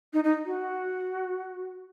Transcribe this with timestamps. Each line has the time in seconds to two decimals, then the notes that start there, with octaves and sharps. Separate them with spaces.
0.13 D#4
0.24 D#4
0.45 F#4